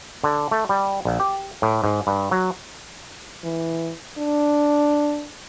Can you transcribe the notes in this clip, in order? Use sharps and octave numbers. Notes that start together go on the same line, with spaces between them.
D3
A3
G3
A#1
G4
A2
G#2
G2
F#3
E3
D4